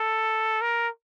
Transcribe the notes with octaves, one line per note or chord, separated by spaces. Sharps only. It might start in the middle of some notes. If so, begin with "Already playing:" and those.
Already playing: A4
A#4